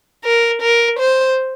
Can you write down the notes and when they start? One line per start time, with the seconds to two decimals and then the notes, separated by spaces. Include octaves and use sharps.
0.24 A#4
0.62 A#4
0.99 C5